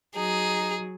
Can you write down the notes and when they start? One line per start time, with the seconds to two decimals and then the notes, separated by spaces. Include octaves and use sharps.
0.16 F#3 D#4 G#4